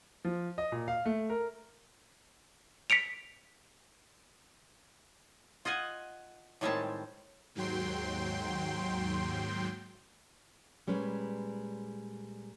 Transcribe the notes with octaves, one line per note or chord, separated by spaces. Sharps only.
F3
D#5
A#2
F5
A3
A#4
B6 C#7 D7 F7
F4 D#5 F#5 G#5
A2 D#3 G3 G#3 C4 A5
D#2 G#2 F#3 G5 C6
A#2 G3 G#3 C#4 B4